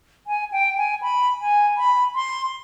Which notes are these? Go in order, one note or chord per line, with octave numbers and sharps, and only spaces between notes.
G#5
G5
G#5
B5
G#5
B5
C6